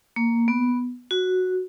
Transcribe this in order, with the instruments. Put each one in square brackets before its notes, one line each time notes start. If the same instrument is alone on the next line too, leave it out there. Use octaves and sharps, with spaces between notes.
[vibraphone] A#3
B3
F#4